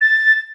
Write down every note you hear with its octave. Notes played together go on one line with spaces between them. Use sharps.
A6